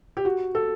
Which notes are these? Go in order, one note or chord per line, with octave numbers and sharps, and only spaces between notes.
G4
F#4
A4